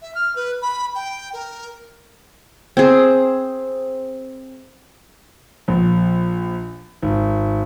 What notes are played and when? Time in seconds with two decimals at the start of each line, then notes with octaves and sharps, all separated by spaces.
0.02 E5
0.15 F6
0.36 B4
0.62 B5
0.95 G5
1.33 A#4
2.77 C4 G#4
5.68 A#1
7.02 G#1